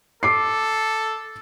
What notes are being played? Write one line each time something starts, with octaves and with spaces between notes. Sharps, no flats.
A4 D6 C7